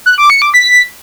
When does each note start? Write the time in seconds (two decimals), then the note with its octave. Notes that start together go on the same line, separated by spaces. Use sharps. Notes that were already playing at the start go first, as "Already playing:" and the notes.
0.06 F#6
0.18 D6
0.30 C#7
0.42 D6
0.54 B6